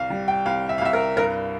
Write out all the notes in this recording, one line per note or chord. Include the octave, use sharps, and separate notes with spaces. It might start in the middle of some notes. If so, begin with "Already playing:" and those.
Already playing: C2 F5
G3
G5
C2 F5
E5
F5
C2 E5
A#4
G2 A#4